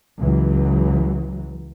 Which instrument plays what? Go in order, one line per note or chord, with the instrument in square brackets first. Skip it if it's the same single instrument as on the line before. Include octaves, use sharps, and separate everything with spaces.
[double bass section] C#2 E3 F#3